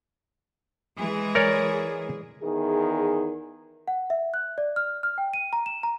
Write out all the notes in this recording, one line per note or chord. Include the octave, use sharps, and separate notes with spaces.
E3 G#3 G#4
A#4 C#5 D5
E2 D#3 G#4
F#5
E5
F#6
D5
F6
F6
G5
D#7
A#5
E7
A#5